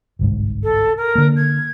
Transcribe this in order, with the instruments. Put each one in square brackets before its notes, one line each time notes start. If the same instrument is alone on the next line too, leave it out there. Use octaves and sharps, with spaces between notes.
[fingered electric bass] G1 C2 G#2
[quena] A4
A#4
[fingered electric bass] D3 A#3
[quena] G#6